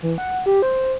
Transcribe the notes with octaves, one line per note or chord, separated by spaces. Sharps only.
E3
F#5
G4
C5